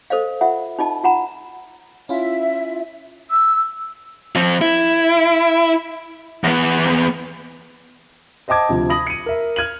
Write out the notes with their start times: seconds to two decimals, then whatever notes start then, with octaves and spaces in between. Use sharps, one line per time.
0.10 A4 C5 D#5 F5
0.41 F4 E5 F#5
0.79 D#4 F4 D#5 A5
1.04 F4 F#5 A#5 B5
2.09 C#4 E4 F4 E5
3.31 E6
4.35 F3 C4
4.61 E4
6.44 E2 B3
8.48 C5 D#5 G5 A5 D6 G#6
8.69 D2 C3 F3
8.89 B5 D#6 A#6 F#7
9.07 C#7 D#7
9.26 A#4 E5
9.56 F6 G#6 D#7 F#7